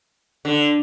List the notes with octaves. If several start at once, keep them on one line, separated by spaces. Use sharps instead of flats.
D3